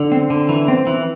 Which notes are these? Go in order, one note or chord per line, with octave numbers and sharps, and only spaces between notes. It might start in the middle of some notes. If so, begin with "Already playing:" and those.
Already playing: D3
C4
D3
E3
C4
E3